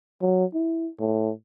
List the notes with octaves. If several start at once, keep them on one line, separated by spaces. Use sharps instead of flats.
F#3
E4
A2